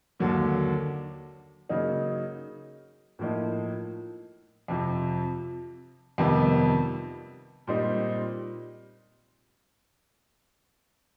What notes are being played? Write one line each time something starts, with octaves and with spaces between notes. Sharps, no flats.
D#2 D3 F#3 A#3
C#3 F#3 A#3 D#4
A2 F3 A#3 D#4
F2 C3 F3
F2 C3 D#3 G3 B3
A#2 G3 C4 D#4